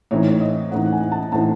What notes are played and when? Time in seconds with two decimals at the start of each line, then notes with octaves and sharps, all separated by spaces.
0.11 A2 E3 C4 D#4 C#5
0.30 C#5
0.41 D#5
0.71 A2 E3 C4 D#4 F#5
0.86 F#5
0.92 G#5
1.12 A5
1.32 A2 E3 C4 D#4 A5